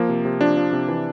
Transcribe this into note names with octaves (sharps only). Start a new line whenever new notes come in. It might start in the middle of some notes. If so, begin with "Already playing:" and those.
Already playing: F3 A#3
C3
C3
F3 D4
F3
C3
E3